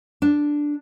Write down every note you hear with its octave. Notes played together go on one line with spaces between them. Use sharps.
D4